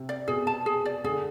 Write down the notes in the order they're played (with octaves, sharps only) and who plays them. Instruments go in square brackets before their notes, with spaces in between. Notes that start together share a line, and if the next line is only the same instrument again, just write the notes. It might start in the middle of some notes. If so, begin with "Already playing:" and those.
Already playing: [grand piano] C3
[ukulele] D5
[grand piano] B2 [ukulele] G#4
[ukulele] A5
G#4
D5
[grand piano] D3 [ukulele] G#4